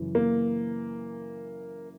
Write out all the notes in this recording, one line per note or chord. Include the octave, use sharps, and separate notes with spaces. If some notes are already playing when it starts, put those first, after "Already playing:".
Already playing: F#2 C#3 E3
A#3